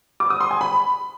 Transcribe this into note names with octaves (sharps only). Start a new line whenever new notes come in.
D6
D#6
C6
G#5
B5